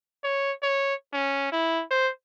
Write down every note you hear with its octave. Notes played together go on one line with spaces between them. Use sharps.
C#5
C#5
C#4
E4
C5